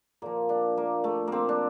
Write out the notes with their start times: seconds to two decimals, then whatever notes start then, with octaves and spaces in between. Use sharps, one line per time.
0.22 A#2 F3 A#3
0.49 D4
0.77 A#3
1.04 A3
1.27 A#3 C4
1.49 D4